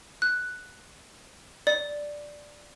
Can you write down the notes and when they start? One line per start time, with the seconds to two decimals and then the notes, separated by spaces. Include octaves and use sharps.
0.22 F#6
1.67 D5